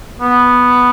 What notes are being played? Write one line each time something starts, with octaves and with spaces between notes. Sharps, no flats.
B3